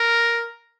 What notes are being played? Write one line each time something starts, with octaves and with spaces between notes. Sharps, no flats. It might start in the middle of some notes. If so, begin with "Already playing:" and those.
Already playing: A#4